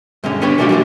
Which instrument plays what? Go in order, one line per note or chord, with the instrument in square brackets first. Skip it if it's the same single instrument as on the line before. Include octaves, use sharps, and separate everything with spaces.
[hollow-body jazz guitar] G2 D3 G#3 C#4
B3 D4 G4 B4 C#5
C#3 G3 A3 D4 F#4 G4
F#2 A#2 E3 D4